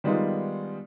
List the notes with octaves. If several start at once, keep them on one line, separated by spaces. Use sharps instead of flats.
D#3 G3 G#3 B3 D#4 F4